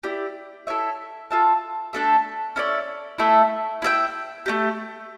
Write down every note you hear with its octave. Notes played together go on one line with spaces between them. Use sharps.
E4 G4 D5
E4 A4 C#5 E5
F4 A4 E5 A5
A3 D4 A4 E5
C#4 E4 A4 D5
A3 E4 A4 E5
E4 A4 E5 G5
A3 D4 G4